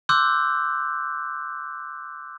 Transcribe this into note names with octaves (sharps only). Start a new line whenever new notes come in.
C6 D6 E6 F#6 G6